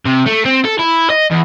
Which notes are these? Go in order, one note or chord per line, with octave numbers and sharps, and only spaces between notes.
C3
A3
C4
A4
E4
D#5
E2